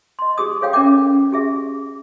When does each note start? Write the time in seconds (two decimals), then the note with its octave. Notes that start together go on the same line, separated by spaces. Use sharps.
0.19 D#5 C6
0.38 G4 G#4 D#6
0.61 G#4 A4 C#5 F5 G5
0.73 C#4 A#4 E5 G5 D6
1.32 G4 G#4 E5